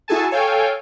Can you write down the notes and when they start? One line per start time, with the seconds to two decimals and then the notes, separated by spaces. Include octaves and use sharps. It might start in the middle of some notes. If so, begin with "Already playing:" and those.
0.08 E4 F#4 G#4 A4 G#5 A5
0.31 A4 C#5 F5 G5 G#5